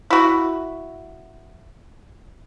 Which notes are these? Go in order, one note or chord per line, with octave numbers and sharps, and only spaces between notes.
E4 F#4